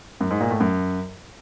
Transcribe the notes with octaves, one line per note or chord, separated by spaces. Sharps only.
F#2
G#2
A#2
A2
F#2